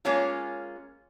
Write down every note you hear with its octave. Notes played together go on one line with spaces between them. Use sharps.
G#3 A#3 C#4 F4